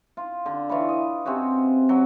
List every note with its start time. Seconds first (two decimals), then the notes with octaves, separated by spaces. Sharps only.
0.17 F4
0.46 D3
0.69 E3 F4 C#5 B5
0.89 D#5
1.26 C3 C4 C#4 F#4
1.89 F#3